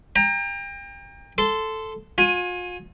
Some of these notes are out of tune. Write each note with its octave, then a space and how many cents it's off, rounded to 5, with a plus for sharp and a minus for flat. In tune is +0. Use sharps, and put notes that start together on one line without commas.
G5 +35 A#5 +0
A4 +0 C6 -15
F4 +40 G#5 +0